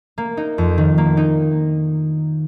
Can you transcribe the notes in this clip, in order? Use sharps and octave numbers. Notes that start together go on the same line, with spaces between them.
A#3
D#4
F2
D#3
A#3
D#4